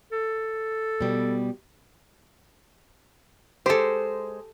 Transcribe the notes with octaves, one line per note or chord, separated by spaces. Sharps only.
A4
B2 G3
G#3 G4 A4 C5